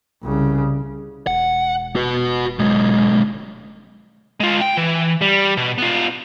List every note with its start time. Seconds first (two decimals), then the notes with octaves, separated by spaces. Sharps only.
0.23 C2 C#3
1.27 E1 F#5
1.96 F#4 B4
2.59 B1 G#3
4.40 G#3 F4
4.61 G5
4.77 E3
5.21 G3
5.57 B2
5.78 B3 F4